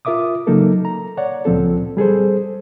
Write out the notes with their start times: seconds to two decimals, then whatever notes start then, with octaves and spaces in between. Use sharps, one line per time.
0.05 F4 A#4 E5 D6 D#6
0.47 C#3 F#3 A#3 D#4 A4 A#4
0.85 A#5
1.17 C#5 D5 F#5
1.45 C#2 A#2 F3 C4 A4
1.97 G3 G#4 A4 C5